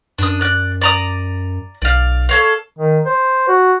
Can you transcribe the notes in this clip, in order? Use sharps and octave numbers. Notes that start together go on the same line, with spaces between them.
F#2 D4 D#6
D5 F#6
D5 A#5 D#6
B1 D5 F5
A4 C#5 F5
D#3
C5
F#4